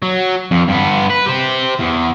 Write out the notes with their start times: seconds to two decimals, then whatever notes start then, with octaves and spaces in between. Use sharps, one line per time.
0.03 F#3
0.51 F2
0.68 G2 B3
1.10 B4
1.26 G4 C5
1.79 E2